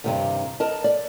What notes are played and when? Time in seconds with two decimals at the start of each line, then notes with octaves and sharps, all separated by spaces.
0.04 G2 C3 D#3
0.60 A#4 D#5 A5
0.84 D5